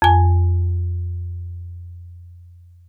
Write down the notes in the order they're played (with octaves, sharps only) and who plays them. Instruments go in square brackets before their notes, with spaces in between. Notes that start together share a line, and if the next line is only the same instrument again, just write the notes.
[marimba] F2 G#5